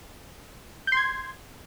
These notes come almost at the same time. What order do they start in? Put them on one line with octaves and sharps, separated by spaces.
G6 C6 G#6